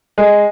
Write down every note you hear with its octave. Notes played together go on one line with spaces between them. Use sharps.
G#3